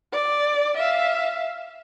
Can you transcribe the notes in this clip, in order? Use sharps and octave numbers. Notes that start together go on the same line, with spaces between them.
D5
E5 F5